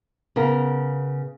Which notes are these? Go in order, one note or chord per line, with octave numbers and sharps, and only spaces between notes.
C#3 B3 A#4